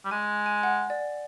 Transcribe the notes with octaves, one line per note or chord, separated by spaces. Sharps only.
G3
G#3 G#5
G#5
F#5
D5